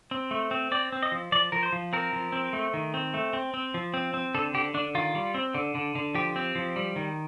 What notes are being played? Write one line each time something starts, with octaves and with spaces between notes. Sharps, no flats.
C4
A3
C4
C4 D5
C4
D#5
F3
F3 D5
F3 A#4
C5
F3
C4 A#4
F3
C4
A3
D#3
C4
A3
C4
C4
F3
C4
C4
D3 A4
D3 G4
D3 D4
D#3 F4
G3
C4
D3
D3
D3
F3 G4
C4
F3
G3
D#3